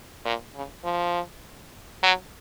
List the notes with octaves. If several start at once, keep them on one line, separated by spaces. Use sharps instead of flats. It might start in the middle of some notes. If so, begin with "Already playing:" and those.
A#2
C#3
F3
F#3